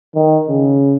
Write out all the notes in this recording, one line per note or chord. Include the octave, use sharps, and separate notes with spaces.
D#3
C#3